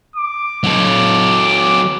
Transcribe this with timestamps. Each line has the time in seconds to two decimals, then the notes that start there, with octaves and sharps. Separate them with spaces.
0.16 D6
0.64 F#3 A4